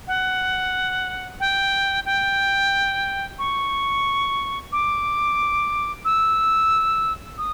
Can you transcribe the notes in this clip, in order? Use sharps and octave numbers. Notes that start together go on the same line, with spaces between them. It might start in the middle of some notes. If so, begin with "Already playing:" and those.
F#5
G5
G5
C#6
D6
E6
D#6